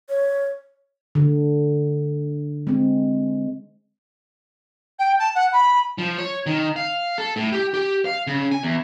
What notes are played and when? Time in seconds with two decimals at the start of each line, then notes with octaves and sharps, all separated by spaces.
0.09 C#5
1.15 D3
2.67 G#3 C4
4.98 G5
5.19 A5
5.35 F#5
5.52 B5
5.98 F3
6.18 C#5
6.46 D#3
6.76 F5
7.18 A4
7.36 A2
7.52 G4
7.74 G4
8.05 F5
8.27 C#3
8.51 G#5
8.63 E2